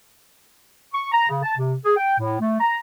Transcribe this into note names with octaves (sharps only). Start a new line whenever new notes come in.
C#6
A#5
C#3
A5
C3
G#4
G5
A2
A3
A#5